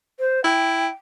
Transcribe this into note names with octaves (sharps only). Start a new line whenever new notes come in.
C5
E4 G5